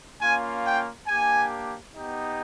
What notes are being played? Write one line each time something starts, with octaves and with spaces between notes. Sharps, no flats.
A#3 C#4 F4 G#5
G5
A#3 D4 G4 G#5
B3 D#4 G4